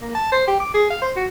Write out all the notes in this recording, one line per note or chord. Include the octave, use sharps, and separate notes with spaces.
A#3
A5
C5
G4
D6
G#4
F5
C5
F#4